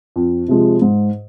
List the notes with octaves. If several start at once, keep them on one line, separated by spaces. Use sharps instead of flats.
F2
C3 F3 G#3
G#2